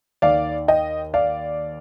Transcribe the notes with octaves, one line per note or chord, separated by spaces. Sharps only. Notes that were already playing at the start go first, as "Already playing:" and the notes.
D#2 D#3 D5 F5
D#5 G5
D5 F5